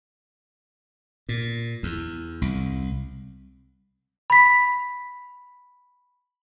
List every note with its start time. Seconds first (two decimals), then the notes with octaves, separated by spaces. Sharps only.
1.29 A#2
1.83 E2
2.42 C2
4.30 B5 B6